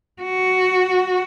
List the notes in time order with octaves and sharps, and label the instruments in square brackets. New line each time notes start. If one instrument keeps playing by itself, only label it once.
[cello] F#4